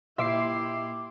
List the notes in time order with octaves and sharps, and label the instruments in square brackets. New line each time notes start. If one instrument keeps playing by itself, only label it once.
[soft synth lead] A#2 [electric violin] E4 G4 [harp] E5 [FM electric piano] C6 D6 C7